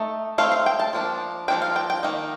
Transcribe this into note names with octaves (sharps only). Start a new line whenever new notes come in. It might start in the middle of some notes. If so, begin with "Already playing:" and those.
Already playing: A3 D#4
A3 C4 D#4 F5
F5
G5
A5
F3 A#3 D4
F3 A#3 D4 G5
F5
G5
G5
D#3 A#3 D#4